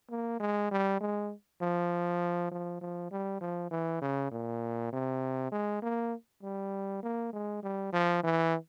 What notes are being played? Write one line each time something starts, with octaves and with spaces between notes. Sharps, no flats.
A#3
G#3
G3
G#3
F3
F3
F3
G3
F3
E3
C#3
A#2
C3
G#3
A#3
G3
A#3
G#3
G3
F3
E3